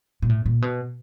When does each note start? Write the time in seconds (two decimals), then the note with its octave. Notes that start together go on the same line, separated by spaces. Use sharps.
0.22 A#2
0.29 A2
0.46 A#2
0.62 B2